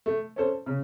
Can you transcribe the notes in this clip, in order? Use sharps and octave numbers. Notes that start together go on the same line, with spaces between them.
A3
C#4 A4 C5
C#3